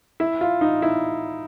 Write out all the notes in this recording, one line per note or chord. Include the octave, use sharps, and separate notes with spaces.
E4
F4
D#4
E4